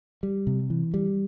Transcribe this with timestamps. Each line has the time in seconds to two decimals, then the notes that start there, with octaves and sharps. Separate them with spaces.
0.23 G3
0.47 C3
0.70 E3
0.94 G3